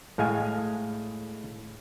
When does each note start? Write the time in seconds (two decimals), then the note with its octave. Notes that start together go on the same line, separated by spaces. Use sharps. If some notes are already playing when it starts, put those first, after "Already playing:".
0.18 A2 G#3 F5 G#5